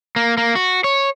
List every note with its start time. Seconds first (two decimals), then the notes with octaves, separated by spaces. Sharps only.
0.16 A#3
0.37 A#3
0.55 F#4
0.84 C#5